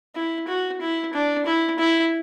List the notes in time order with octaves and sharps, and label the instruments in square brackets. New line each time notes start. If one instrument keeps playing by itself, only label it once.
[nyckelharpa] E4
F#4
E4
D4
E4
E4